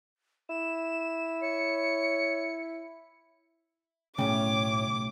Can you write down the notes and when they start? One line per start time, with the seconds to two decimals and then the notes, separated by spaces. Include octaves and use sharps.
0.49 E4 E7
1.42 C#5 C#7
4.18 B1 A2 C#3 A3 C#5 G5 D6